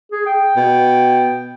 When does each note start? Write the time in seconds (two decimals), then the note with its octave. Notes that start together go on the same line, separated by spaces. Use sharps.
0.12 G#4
0.26 G5
0.57 B2